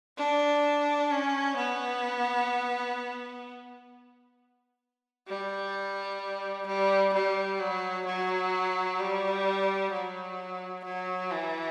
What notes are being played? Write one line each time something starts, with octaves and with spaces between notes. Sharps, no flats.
D4
C#4
B3
G3
G3
G3
F#3
F#3
G3
F#3
F#3
E3